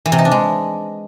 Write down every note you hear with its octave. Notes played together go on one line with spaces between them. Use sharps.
E3
C3
D#4
D4
G#3